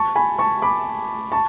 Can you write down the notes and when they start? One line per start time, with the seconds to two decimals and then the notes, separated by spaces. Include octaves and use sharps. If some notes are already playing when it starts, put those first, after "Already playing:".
Already playing: A5 C#6
0.16 G#5 B5
0.39 A5 C#6
0.62 B5 D6
1.32 A5 C#6